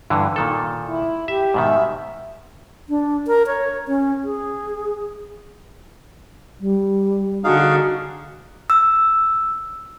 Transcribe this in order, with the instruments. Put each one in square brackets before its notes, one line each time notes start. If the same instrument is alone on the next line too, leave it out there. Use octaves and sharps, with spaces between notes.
[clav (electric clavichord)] G2 D3 E3
A#2 D#3 A4
[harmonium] E4
[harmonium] G4 [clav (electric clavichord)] E5
[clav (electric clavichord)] G#2 B2 D#3 [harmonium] E5
[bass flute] D4
A#4
C#5
C#4
G#4
G3
[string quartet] D3 D4 [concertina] D#4 G#4 F5 [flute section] F#4 C#6
[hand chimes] E6